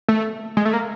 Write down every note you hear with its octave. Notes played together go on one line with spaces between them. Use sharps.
A3
G#3
A3
A#3